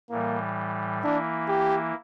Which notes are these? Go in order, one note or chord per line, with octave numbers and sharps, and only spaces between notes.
A2 E3 G3 A#3
E3 A#3 D4 E4
G4